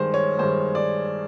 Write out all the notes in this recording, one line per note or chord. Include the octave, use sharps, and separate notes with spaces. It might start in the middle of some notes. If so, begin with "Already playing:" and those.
Already playing: G2 D#3 G#3 C5
C#5
G2 D#3 G#3 C5
D5